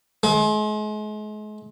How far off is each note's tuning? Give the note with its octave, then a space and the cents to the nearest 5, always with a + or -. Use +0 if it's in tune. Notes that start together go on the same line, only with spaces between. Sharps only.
G#3 +40